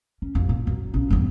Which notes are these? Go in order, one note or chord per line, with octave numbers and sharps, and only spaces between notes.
C#4
A1 F2
A#2
F#2
A#1 C#4
E2 G2